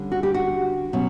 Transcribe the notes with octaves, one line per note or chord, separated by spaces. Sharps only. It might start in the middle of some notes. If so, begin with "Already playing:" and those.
Already playing: D3 G3 C#4
F#4
G4
F#4
B2 F#3 C#4